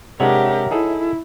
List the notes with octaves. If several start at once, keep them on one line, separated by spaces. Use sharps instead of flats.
C3 G#3 D4 G4 A#4 C#5 E5 F#5
D#4 E4 G#4 A4